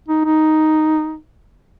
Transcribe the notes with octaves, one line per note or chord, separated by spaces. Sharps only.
D#4
D#4